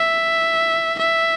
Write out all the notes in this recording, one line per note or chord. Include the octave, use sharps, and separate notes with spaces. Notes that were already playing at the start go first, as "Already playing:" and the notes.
Already playing: E5
E5